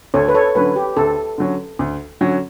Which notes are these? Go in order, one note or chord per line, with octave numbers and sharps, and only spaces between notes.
D2 A4 C#5
B4
A4 C#5
D3 F#3 C#4 B4
G4
D2 A4
D3 F#3 C#4
D2
D3 F#3 C#4